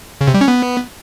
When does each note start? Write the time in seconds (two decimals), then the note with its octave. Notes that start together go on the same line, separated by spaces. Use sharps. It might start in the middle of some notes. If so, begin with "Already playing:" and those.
0.21 C#3
0.28 C3
0.34 G3
0.41 C#4
0.48 B3